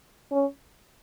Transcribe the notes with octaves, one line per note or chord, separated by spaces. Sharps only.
C#4